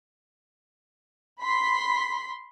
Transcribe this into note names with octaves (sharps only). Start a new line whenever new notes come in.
B5 C6 B6